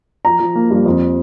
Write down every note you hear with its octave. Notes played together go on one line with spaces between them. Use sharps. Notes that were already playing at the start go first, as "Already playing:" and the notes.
F3 A#5
F3
A#3
G2
F2